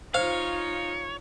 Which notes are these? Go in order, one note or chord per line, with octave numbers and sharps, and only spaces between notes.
D#4 F4 C5 C#5 F5